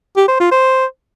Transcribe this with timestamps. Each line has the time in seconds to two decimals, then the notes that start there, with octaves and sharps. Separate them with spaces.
0.16 G4
0.28 C5
0.40 F4
0.51 C5